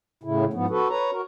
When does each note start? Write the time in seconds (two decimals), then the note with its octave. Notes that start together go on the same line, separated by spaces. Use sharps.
0.24 A2 C#3 E4
0.53 G#2 F3 B3
0.69 F#4 A4 B4
0.90 B4 C#5 A#5
1.12 F#4 A#4